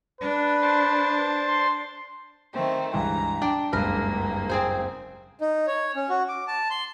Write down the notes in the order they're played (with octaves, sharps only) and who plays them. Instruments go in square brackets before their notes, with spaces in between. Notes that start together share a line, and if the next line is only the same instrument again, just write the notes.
[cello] D4 [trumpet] B4
[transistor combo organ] C5 A5
[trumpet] C6
[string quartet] D#3 A3 C4
[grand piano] C#2 G2 E3 [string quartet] A#5
[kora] D4 [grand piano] G5
[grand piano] F#1 C#2 [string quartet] G2 A#3 [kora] A#4 B4
[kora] C4 G#4 C5
[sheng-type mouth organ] D#4
C#5
C#4
F#4
D6
A5
C6